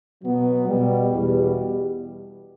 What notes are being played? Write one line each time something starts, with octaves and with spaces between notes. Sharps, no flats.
B2 F#3 B3
B2 G3
E2 B2 G3